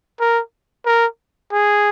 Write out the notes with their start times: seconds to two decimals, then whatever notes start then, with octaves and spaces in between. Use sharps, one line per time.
0.20 A#4
0.86 A#4
1.52 G#4